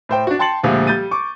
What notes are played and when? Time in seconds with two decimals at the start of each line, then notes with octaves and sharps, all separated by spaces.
0.09 A2 C5 G5
0.27 D4 F#4
0.39 G5 A5 C6 A6 C#7 F#7
0.63 D2 A#2 F3 G3 G#3
0.87 G3 G6 A6 D#7
1.11 C#6 D6